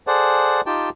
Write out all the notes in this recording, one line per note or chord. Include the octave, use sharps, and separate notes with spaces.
G#4 A4 C5 D5 F#5
D#4 F4 G4 G5 A5